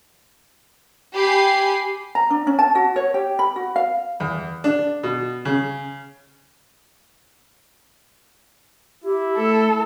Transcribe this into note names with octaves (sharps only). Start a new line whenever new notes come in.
G4 G#5 B5 C7
A#5
D4
C#4
A5
F#4
C#5
G4
B5
F#4
F5
E2
D4
B2
C#3
E4 G4
A3 A4